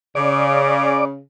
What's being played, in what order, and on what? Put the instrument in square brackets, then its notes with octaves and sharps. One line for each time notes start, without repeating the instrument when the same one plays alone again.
[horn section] C#3 [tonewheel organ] D5 D6